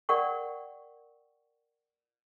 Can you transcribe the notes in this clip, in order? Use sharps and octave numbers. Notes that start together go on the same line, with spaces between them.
A#4 D5 F#5 G5 C#6